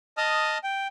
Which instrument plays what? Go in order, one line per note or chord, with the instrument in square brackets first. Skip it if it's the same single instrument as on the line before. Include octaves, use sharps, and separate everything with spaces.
[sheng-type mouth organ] D#5 A5 D#6 F6
G5